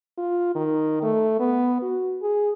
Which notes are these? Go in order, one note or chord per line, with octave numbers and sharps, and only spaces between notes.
F4
D#3
A3
B3
F#4
G#4